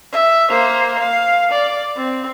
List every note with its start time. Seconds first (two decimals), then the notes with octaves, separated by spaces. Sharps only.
0.12 E5
0.49 A#3 C5
1.00 F5
1.51 D5
1.97 C4